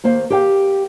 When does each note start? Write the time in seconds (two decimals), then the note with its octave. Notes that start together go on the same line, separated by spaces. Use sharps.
0.04 D#2 A#3 C5 F5
0.30 G4 A#4 F5 G5